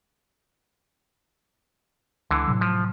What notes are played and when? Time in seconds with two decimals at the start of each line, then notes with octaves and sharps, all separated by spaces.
2.31 C#2 D3 E3
2.47 A2 C3 F#3
2.61 F3